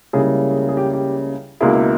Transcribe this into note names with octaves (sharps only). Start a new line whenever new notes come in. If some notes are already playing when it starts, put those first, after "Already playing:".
C#2 C#3 G3 A#3 E4 G#4
G#4
G#4
G4
G4
C#2 B2 A#3 E4 G#4